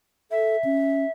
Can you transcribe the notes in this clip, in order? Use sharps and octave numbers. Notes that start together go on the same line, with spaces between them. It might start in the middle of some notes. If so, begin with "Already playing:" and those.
A4 E5
C#4